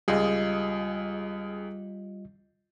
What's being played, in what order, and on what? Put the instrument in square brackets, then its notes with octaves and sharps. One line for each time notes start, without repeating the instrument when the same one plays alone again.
[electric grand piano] C#2 G#4 [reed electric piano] G3 F4 D#5